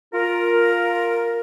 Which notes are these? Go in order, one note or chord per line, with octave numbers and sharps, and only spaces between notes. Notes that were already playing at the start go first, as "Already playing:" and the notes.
F4 A#4